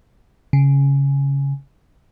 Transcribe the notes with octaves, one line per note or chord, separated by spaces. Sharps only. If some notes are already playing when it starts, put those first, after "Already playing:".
C#3